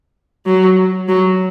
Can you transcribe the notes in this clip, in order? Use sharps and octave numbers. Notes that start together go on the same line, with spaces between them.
F#3
F#3